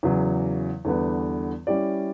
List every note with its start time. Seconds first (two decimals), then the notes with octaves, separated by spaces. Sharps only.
0.03 E2 C#3 F#3
0.85 E2 D3 G3 B3
1.67 G3 C#4 E4 G4 D5